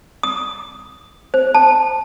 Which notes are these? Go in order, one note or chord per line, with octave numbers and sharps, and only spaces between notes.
D#6
C5
A5